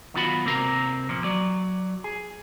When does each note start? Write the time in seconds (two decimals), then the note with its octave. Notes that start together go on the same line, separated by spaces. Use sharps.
0.14 B1 D#3 B3 F4 F#4 B5
0.45 C3 A#3 C4 A#4 A#5
1.09 E2 A#2 F3
1.24 F#3 D5
2.04 G#4